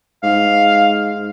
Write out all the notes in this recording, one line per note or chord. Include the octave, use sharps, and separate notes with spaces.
G#2 F5